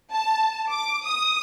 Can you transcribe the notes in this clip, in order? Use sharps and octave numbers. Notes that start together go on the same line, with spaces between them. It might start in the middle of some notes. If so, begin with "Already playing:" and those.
A5
D6
D#6